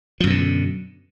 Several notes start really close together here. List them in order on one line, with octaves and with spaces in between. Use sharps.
F3 F#2 B2 D3